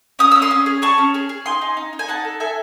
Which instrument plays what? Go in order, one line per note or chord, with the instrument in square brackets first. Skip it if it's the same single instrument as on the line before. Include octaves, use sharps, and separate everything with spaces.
[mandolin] C#4 D#6
C#4 E6
C6 D#6
C#4
G#4
G#4 A5 C#6
C#4
G#4
G#4
D#4 G#5 C6
D#4
D#4
D#4
G#5
D#4 F#5 A5
A4
A4 E5 G#5